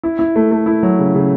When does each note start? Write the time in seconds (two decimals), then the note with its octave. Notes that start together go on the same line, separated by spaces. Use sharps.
0.03 E4
0.19 E4
0.36 A3
0.52 A3
0.66 E4
0.83 F#3
0.99 C#3
1.15 C#3